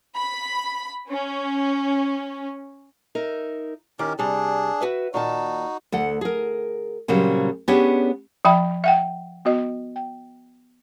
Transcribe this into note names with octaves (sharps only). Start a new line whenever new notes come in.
B5
C#4
D#4 A#4 E5
D#3 C#4 G4 A#4
C3 G3 D4 G#4
F#4 B4 E5
A#2 D#3 D#4 F#4 A5
D2 A4 F#5
G#4 A#4
A#2 C#3 F#3 G3 C4
B3 C#4 D4 G4 G#4 C#5
F3 E5 G5 B5
E5 F#5 G5
B3 F#4 D#5
G5